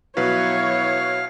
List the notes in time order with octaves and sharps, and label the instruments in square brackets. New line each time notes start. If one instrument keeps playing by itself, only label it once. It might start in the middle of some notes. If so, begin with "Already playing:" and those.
[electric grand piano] B2 F#3 B4 [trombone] E4 [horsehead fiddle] C#5 [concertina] F5